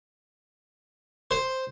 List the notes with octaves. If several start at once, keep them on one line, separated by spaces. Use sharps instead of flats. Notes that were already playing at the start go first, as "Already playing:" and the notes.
C5